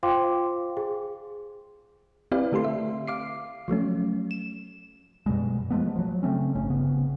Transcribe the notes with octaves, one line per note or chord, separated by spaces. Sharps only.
F4 C5 F5 G5 C6 D6
G#4
C4 E4 G4 B4 D5 F5
D3 A3 G4 A4 C6
E5
F5 D6 C7
F3 F#3 A3 C#4
E7
F#2 B2 G3 G#3
F3 G#3 A3 B3
F3 F#3
C#3 A3 C4 C#4
G1 A2 C#4
G1 C#3 B3